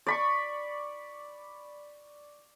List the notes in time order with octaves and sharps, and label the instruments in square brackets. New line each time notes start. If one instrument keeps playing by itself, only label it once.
[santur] D5 B5 C#6